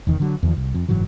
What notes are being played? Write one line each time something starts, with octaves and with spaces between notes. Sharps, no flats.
F1 E2 D#3
D3 F#3
E2 D#3 F3
C2
F2
F#1 G#2 E3 F#3